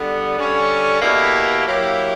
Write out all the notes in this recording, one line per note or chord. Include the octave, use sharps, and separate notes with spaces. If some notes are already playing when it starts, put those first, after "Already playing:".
Already playing: D3 G3 B3
D3 G3 C#4
B2 A#3 E4 G4
F#3 A#3 E4 G4